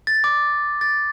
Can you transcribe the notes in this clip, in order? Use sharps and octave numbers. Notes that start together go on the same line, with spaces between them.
A6
D6
A6